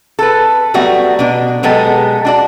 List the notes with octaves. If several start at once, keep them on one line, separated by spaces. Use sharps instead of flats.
A4 B4
F#3 G3 A3 B3 F#4
B2 D4
B2 F#3 G#3 B3 G4 A4
D4 F#4 D5